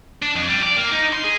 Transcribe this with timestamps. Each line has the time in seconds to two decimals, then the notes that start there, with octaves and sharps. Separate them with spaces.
0.22 D4
0.36 F2
0.48 G3
0.63 D5
0.77 A#3
0.92 D#4
1.13 C6
1.24 G#4